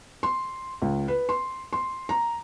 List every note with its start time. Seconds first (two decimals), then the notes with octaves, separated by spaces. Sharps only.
0.23 C6
0.82 C#2
1.08 B4
1.29 C6
1.73 C6
2.09 A#5